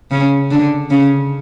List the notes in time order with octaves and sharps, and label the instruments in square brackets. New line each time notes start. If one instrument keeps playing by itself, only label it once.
[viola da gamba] C#3 C#4
D3 D4
C#3 C#4